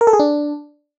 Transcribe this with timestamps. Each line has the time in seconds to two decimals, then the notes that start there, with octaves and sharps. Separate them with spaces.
0.01 A#4
0.07 A4
0.13 G#4
0.20 D4